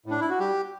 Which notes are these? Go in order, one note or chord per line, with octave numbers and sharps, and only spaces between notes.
A2 D4
E4
F#4
G3 G4